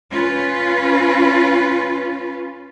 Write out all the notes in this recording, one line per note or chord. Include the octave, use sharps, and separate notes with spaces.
C#4 F4 B4